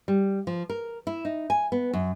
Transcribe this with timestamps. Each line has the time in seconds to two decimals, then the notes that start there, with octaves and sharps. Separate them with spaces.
0.08 G3
0.47 F3
0.70 A#4
1.07 E4
1.25 D#4
1.50 G#5
1.72 B3
1.93 F#2